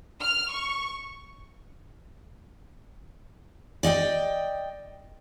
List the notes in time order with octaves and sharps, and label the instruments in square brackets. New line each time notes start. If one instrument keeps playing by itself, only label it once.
[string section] F6
C#6
[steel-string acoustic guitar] D5 D#5 F#5 G5